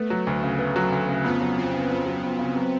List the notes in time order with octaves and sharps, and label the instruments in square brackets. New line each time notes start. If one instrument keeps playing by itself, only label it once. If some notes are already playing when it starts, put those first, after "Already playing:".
Already playing: [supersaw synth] A3 [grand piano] B3
[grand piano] F#3
D2
C#3
B3
F#3
D2
C#3
[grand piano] F2 [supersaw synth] B3
[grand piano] F#3
[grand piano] F2 [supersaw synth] C4
[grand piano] C#3
[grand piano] F2 [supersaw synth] B3
[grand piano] F#3
F2
C#3
F#3